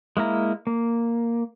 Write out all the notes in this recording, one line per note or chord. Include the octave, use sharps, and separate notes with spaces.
G#3 A#3 E4 A#5
A#3